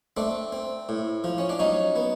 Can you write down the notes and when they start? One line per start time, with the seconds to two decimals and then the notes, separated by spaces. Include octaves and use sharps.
0.17 A3 C4 D4
0.52 C4
0.89 A2
1.24 F3
1.38 C#4
1.49 D4
1.59 F#3 C#4 D#4
1.96 B3